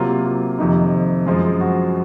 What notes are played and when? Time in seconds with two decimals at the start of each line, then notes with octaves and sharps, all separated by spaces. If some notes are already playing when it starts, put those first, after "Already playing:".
Already playing: C3 F#3 A#3 F4
0.25 F4
0.58 F2 C3 D#3 D#4
1.26 F#2 F3 G#3 F4
1.61 F#4